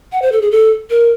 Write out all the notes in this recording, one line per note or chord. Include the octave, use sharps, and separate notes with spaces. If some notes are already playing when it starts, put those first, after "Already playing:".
F#5
C5
A4
G#4
A4
A#4